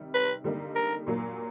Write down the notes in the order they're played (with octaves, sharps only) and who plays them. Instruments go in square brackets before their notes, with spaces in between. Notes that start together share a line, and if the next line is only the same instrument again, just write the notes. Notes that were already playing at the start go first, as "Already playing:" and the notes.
Already playing: [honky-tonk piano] C3 D#3 G3
[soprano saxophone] B4
[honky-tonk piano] D3 G3 A#3 D#4
[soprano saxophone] A#4
[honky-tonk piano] A#2 F#3 A#3